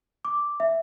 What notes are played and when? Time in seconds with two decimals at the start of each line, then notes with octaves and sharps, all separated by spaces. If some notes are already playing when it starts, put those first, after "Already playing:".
0.25 D6
0.60 E5